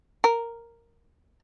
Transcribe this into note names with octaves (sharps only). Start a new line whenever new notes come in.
A#4